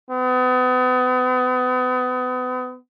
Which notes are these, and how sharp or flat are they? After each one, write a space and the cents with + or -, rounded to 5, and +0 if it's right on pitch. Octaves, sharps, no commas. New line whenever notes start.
B3 +35